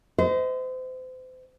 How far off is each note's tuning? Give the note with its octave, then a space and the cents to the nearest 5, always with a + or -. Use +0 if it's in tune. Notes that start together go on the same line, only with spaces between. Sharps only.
C5 -35 D#5 +30